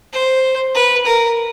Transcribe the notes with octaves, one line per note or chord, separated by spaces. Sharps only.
C5
B4
A#4